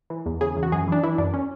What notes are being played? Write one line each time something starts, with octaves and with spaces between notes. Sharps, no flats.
E3
E2
C#3 G#4
E2
F#4
F#2 G#4
E3 D4
E3 E4
F#2 D4
C#4